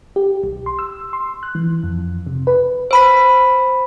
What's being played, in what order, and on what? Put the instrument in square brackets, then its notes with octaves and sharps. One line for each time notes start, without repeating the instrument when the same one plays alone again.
[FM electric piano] G4
B1
C6
E6
C6
F#6
E3
F2
C3
B4
[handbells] C5 B5 B6